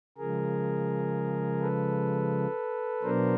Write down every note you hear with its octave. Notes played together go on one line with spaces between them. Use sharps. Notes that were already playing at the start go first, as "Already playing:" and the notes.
C#3 F3 G#3 G#4 A#4
A4 B4
B2 F#3 B3 D4 A#4 C5